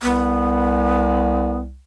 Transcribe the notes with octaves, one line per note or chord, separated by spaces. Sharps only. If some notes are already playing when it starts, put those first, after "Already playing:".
C2 B3